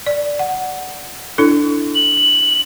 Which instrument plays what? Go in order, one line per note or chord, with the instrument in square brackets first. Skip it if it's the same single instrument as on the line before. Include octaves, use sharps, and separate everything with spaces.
[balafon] D5
F#5
D4 E4 A4
[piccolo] F#7